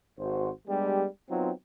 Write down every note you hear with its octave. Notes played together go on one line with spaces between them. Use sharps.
G#1 F#4 C5
G3 G#3 B3 D4 G4
F#3 B3 C4 D#4 F4